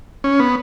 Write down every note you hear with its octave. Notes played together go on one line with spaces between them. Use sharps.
C#4
B3